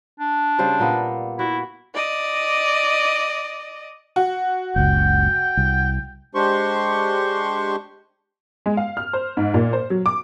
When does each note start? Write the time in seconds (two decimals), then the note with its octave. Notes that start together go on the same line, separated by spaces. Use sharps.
0.20 D4
0.59 C#3 G3 C5
0.80 A#2 A#3 B3
1.39 E4 F#4
1.94 D5 D#5
4.16 F#4
4.76 F#1 C#2 G5
5.57 C2
6.35 G#3 D4 G4 C5 C6 C#6
8.66 G#3
8.77 F5
8.97 F6
9.13 C5
9.37 G#2
9.54 A#2
9.73 C5
9.90 F#3
10.06 D6